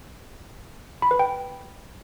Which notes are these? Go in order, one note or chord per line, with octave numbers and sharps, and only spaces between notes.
B5
B4
G5